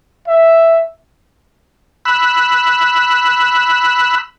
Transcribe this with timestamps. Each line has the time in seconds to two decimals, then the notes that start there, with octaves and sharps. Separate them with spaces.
0.28 E5
2.05 B5 E6 F#6